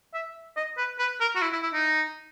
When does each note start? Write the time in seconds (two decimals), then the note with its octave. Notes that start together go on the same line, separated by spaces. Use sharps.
0.14 E5
0.57 D#5
0.78 B4
0.99 B4
1.20 A#4
1.36 F#4
1.42 E4
1.52 E4
1.63 E4
1.73 D#4